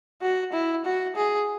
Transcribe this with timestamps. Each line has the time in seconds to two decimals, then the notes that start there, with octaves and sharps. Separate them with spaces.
0.22 F#4
0.53 E4
0.85 F#4
1.16 G#4